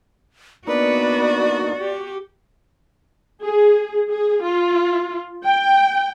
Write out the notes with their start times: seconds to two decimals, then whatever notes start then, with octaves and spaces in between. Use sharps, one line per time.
0.67 A#3 B3 D4 D#4 F#4 B4 D5
1.80 G4
3.43 G#4
4.10 G#4
4.43 F4
5.44 G5